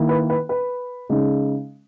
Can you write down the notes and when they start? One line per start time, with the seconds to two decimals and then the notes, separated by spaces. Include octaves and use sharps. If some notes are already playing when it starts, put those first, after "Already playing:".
Already playing: D#3 A#3 E4
0.09 B4
0.30 B4
0.49 B4
1.09 C#3 G#3 D#4